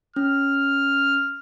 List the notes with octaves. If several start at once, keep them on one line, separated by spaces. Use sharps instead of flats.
C#4 F6